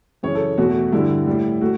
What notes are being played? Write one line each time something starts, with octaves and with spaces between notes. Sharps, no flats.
F#2 C#3 E3 C#5
A4
E2 B2 A3 F#4
G2 D3 G3 E4
A2 G3
A3 F#4